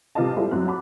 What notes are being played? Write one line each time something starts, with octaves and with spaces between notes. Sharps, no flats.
C3 G3 F4 B4 D#5 A5
G3 G#3 E4 F4 A4 C5
F#2 C4 F#4 F#6
F#5 A5 B5 D6